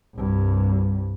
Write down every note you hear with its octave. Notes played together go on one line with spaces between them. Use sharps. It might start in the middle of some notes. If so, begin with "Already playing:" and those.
C2 G2